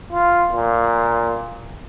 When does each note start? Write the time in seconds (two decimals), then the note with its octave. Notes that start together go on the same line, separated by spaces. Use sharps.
0.13 F4
0.53 A#2